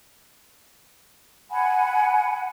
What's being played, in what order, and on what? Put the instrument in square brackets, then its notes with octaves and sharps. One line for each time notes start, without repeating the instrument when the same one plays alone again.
[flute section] F#5 G#5 B5